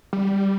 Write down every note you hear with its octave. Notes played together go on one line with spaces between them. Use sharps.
G3